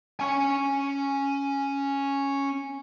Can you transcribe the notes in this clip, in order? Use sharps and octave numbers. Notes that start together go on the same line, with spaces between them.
C#4 G#5